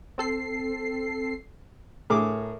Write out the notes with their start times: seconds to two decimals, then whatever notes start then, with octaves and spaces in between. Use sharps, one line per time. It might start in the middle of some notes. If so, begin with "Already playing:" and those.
0.18 C4 A4 C7
2.10 A2 G#4 A#4 D6